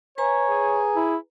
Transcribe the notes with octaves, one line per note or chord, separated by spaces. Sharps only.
B4 C#5 G#5 A#5
G#4
E4